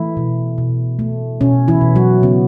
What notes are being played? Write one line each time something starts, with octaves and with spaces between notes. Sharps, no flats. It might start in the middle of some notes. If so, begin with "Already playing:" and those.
Already playing: E3 A3 E4
B2
B2
A3
B2 C#4
E3 E4
B2
F#3 F#4
C#3 B3